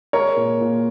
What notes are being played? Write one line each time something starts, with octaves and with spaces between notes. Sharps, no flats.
G#3 A#4 C#5
A#2
A#2